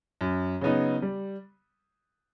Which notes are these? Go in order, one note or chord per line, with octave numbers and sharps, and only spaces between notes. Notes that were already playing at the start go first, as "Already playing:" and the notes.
F#2
C#3 F#3 B3 D#4
G3